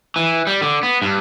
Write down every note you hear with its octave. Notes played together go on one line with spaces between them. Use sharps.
E3
G3
D3
B3
G2